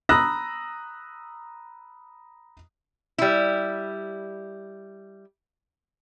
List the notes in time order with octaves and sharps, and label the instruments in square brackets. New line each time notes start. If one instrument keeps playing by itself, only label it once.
[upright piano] A#5 B5 D#6 E6 F#6 A#6
[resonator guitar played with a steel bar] G3 E4